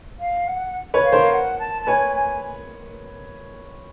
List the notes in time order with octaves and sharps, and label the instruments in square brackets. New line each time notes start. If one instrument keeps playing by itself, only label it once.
[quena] F5
F#5
[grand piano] B4 C#5
[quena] F5
[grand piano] A#4 C5
[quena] F#5
A5
A5
[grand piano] B4 C#5 [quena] G#5
[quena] G#5